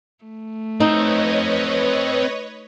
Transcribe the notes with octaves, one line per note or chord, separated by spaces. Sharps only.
A3
C4 D#4 A4 B4 C#5 D#5